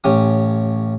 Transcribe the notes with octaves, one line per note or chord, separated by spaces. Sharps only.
A1 C#4 G4 D#6